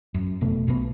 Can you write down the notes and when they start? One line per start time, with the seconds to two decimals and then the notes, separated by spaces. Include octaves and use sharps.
0.14 F#2
0.41 F1 B2 A3
0.67 B1 B2 E3 B3